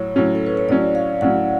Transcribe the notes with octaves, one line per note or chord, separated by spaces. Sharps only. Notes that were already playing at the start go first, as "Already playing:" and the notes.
Already playing: A2 F#3 C#5
A2 F#3 C#4
A4
B4
C#5
A2 F#3 C#4 D5
F5
A2 F#3 C#4 F#5